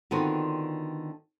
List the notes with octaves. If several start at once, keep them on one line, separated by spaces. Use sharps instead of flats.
D3 D#3 B3 C4 F4 F#4